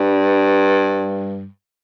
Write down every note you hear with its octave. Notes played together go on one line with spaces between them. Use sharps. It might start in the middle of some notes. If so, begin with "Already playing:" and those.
Already playing: G2